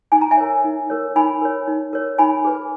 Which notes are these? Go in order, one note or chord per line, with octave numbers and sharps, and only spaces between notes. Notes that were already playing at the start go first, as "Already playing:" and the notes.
D#4 G#5
A#5
E5 G#5
A#4 C#5
D#4
A#4 C#5
D#4 G#5 B5
A#4 C#5
D#4
A#4 C#5
D#4 G#5 B5
G#4 B4